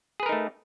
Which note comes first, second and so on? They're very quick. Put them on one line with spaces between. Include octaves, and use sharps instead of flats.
G#4 B4 A#4 D#4 A3